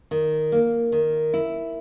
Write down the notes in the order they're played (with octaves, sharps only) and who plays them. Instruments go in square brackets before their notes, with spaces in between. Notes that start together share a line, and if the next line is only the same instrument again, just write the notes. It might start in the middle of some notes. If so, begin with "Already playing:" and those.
[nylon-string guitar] D#3
A#3
D#3
E4